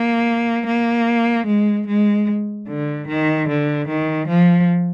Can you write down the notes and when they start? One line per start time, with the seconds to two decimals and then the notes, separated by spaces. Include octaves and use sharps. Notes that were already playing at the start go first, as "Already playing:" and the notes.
Already playing: A#3
0.67 A#3
1.47 G#3
1.87 G#3
2.68 D3
3.08 D#3
3.49 D3
3.89 D#3
4.28 F3